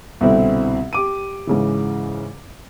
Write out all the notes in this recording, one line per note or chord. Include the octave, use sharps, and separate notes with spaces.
C2 B2 D3 C4 E4
G4 D6 D#7
G#2 C#3 E3